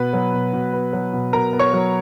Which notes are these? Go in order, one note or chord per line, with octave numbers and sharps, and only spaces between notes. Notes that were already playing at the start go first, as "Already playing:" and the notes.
Already playing: B2 B3 B4
F#3
B2
B2
B3
F#3
B2
B2 A#4 A#5
B3
C#5 C#6
F#3